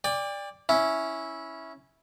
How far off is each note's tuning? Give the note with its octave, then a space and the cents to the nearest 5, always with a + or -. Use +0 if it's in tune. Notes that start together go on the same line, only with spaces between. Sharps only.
D5 +0 G5 +40
C#4 +0 E4 -10